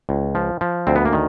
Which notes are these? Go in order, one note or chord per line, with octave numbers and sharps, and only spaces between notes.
C#2
F3
F3
D2 C4
B3
A#3
D#3